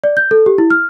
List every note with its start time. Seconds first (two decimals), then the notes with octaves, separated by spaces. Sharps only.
0.04 D5
0.17 G6
0.31 A4
0.46 G4
0.58 E4
0.70 F6